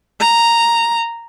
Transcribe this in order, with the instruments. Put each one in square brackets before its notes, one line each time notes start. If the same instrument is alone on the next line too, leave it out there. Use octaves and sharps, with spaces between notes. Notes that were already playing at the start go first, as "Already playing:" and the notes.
[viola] A#5